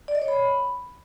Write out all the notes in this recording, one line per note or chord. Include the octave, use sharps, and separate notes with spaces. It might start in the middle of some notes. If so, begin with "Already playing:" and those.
D5
D#5
C#5
B5